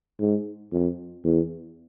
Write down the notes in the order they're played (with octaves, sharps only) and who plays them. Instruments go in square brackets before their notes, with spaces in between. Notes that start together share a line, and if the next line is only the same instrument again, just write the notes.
[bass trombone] G#2
F2
E2